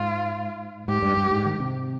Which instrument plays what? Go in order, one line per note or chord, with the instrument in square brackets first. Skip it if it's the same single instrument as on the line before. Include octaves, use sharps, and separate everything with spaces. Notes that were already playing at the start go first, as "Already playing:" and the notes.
Already playing: [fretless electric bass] G#2 [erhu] F4
[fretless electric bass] G#2 [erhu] G4
[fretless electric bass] G2
G2
G#2
D#3
C3